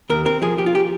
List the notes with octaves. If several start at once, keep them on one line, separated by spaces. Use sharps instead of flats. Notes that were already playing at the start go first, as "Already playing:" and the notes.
D#2 A#4
C4 A#4
F3 G#4
F3 G4
F4
G4